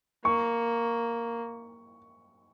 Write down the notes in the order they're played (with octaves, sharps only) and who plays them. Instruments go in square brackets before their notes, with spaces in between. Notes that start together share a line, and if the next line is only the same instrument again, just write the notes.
[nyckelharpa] A#3 [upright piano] C#6